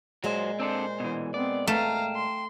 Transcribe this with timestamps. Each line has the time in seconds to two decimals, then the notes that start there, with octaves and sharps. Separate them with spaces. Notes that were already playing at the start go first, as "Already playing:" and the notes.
0.24 A#2 F#3 G#3 C5
0.60 C4 D4 A4 C5
1.00 B2 E3
1.34 B3 C4 D5
1.67 A3 F5 G5 A5 A#5
2.15 C6